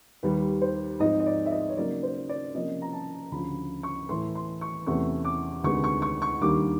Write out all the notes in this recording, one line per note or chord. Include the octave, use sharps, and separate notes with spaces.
D#2 D#3 G3 B4
C5
G#2 F3 G#3 C4 D#4 D#5
D#5
D5
E5
D#5
C#5
C#3 F#3 A#3 D#4 D5
C5
D5
C3 F3 A#3 C#4 D#5
A#5
A5
D2 C#3 F3 B5
C#6
A2 E3 A3 C6
C6
C#6
E2 C3 E3 A3 C#4 C#6
D6
D2 C3 D#3 G#3 B3 C#6
C#6
C#6
C#6
D#2 D#3 G3 A#3 D4 D6